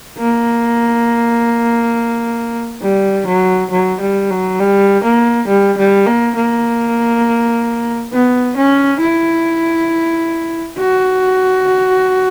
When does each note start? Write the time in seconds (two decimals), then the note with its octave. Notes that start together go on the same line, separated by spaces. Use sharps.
0.18 A#3
2.82 G3
3.27 F#3
3.71 F#3
4.01 G3
4.30 F#3
4.60 G3
5.04 A#3
5.48 G3
5.78 G3
6.07 A#3
6.36 A#3
8.13 B3
8.57 C#4
9.01 E4
10.78 F#4